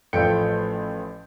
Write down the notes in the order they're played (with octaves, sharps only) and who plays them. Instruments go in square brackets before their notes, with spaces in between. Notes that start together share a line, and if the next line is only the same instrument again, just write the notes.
[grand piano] A1 F3 A3 G5 G6 C#7